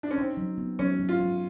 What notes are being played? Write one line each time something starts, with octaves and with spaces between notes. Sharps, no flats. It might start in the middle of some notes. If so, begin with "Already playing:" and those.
D4
C#4
C4 D#4
F#3
B3
F#3 C#4
F#3
F4
F#3